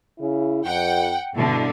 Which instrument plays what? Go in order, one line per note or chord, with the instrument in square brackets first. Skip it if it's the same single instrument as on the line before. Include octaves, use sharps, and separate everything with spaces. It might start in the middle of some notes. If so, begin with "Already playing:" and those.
[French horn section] C#3 E4
[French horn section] F2 [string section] F#5 G5
[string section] G2 B2 D3 [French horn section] E4 A4